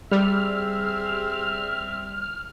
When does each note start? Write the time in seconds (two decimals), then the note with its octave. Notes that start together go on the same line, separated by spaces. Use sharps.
0.11 G3 C4 G#4 E5 F6